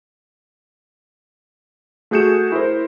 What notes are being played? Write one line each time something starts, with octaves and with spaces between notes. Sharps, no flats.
A3 F#4 G#4 G6 C#7 E7
E4 A#4 C5